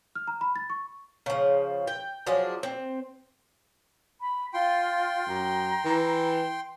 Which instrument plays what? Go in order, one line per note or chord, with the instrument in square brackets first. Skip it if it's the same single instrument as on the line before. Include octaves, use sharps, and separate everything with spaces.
[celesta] F6
A#5
B5
A6
C#6
[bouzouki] C#3 F3
G5
F3 F#3 D4 G#4
C4
[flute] B5
[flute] F4 [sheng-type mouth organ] G5 C6
[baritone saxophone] F#2 [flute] A#5
[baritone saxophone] E3